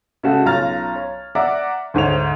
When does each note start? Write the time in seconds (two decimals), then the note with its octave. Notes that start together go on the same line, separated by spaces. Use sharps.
0.23 C#3 G#3 A3 F#4 A4
0.45 B1 C#4 F4 A#5 F6 A6
0.96 C#5
1.35 D5 E5 F#5 A#5 D6
1.94 D2 G#2 C#5 F7